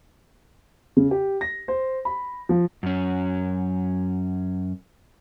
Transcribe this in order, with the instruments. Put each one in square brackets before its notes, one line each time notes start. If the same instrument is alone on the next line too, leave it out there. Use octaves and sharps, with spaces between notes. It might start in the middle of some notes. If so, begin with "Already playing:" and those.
[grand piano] C#3
G4
A#6
C5
B5
F3
[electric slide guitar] F#2 C#4